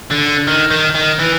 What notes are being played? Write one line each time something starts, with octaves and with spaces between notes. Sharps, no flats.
D3
D#3
D#3
D#3
E3